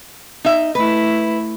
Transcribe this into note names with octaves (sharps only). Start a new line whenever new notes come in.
D#4 E5
A3 E4 B4